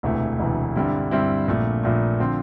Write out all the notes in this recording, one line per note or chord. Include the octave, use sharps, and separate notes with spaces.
E1 D2 C3 E3 A3
E1 D2 C3 E3 A3
G2 D3 G3 C4 E4
G2 D3 G3 C4 E4
A#1 A#2 A3
A#1 A#2 A3
D3 F3 C4